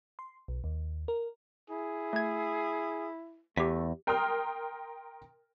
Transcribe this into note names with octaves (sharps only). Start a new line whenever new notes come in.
C6
B1
D#2
A#4
E4 G#4
A3 G#6
E2 A3 G4 B6
A#4 G5 A#5 C6 D#6 F6